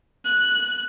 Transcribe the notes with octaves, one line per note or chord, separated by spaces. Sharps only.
F#6